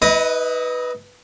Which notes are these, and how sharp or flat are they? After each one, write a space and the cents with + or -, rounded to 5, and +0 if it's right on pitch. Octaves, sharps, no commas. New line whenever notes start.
E4 -45 B4 +0 D#5 +0